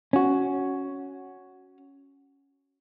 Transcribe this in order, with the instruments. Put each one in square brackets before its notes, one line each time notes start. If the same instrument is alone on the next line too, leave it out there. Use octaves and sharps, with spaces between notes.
[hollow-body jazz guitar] C#4 F#4